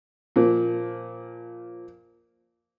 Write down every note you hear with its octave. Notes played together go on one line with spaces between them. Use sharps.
A#2 F3